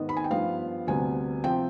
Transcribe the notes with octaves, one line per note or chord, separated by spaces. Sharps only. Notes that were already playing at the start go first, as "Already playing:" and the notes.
Already playing: G#2 D#3 B3 D#5
B5
G#5
G5
G2 F3 B3 F5
D2 C3 G3 B3 G#5
C3 F3 C4 G5